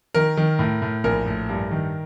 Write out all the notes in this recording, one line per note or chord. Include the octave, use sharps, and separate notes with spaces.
D#3 A#4
D#3
A2
A2
A#1 A#4
A2
G2
D#3